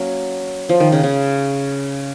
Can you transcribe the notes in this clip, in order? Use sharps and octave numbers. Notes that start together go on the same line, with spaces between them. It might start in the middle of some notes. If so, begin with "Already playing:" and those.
Already playing: F#3 A#3 C#4
F3
D#3
C#3
C#3